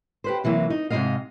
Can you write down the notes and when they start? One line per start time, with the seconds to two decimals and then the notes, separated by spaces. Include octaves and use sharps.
0.24 G4 B4 C5
0.44 C3 E3 F#3 A#3
0.70 D#4
0.90 G#2 C3 D#3 B3 D#5 F5